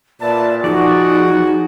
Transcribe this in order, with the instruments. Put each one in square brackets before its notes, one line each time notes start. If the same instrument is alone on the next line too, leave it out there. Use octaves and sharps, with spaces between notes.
[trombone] A#2 [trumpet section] B4 E5 A5 [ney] D5
[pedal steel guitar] F3 D5 [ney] D#4 [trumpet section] F#4 [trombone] G#4